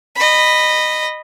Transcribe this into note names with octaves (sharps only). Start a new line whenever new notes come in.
D#5 B5